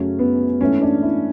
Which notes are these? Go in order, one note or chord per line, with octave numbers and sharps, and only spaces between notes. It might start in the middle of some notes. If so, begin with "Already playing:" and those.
Already playing: F#2 C#3 F#3 A3 C#4
B3
G#2 E3 A3 C#4
D4
E4